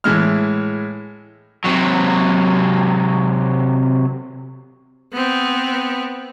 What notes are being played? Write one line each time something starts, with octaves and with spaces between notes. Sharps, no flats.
A2 E3 G#3 F6
C3 F#3
B3 C4